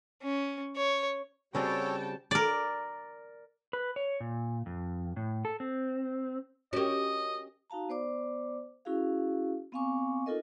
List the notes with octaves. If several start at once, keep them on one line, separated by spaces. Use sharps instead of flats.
C#4
C#5
C#3 G3 C4 F#4 A4 C#5 G5 A5
A#4 D5
B4
C#5
A#2
F2
A2
A4
C4
C#4 F#4 G4 A#4 D#5
D#4 F#4 F5 A5 A#5
B3 C5 D5 D6
C#4 E4 F#4 G#4 F5
B3 C4 F5 G#5 C#6 D6
D#4 F4 A4 A#4 D#5